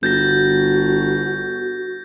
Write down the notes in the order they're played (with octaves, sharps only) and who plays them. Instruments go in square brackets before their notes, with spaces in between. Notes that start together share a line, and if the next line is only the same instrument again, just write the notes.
[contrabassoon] G1 [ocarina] F#4 [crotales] G6 A6 A#6